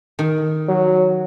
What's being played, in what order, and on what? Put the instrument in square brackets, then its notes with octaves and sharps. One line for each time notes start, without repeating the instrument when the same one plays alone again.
[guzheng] D#3
[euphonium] F#3